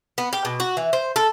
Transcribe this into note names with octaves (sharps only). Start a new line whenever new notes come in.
B3
G4
B2
F#4
E3
C5
A4